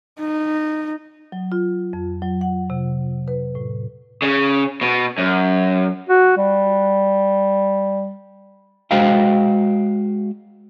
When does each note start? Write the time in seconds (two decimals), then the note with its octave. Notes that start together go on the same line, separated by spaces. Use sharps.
0.20 D#4
1.32 F#3
1.52 F4
1.93 F2
2.22 F#3
2.41 F#5
2.70 C3
3.28 B4
3.55 A2
4.22 C#3
4.81 B2
5.18 F#2
6.09 F#4
6.37 G3
8.91 G#3 F#4 C5 D#5 F5 G5